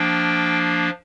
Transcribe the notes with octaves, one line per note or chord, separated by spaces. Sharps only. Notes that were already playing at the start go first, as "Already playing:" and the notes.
Already playing: F3 A#3 D4 G5